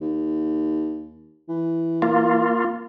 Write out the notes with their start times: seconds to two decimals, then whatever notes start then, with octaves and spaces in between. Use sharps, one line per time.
0.01 D#2
1.49 E3
2.02 A#3 F4